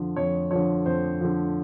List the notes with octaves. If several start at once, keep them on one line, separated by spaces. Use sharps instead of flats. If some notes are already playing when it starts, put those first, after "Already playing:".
Already playing: F2 D3 F3
F2 C#5
D3 F3 C#5
F2 C5
D3 F3